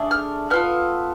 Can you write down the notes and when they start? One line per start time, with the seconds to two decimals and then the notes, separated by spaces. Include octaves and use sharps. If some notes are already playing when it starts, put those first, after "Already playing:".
Already playing: A3 D4 G#4
0.11 F6
0.50 B3 F4 A4 F6